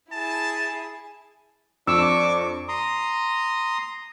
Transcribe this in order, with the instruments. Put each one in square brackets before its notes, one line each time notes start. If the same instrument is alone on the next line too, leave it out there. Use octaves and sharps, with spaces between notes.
[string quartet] E4 G#4 [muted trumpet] A5
[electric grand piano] F2 [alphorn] D4 [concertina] C#6 D6 [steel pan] E6
[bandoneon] A#5 C6 D#6